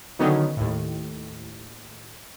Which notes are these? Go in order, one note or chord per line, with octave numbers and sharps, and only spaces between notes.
D3 D#3 F#3 B3 C#4 D#4
D#2 A2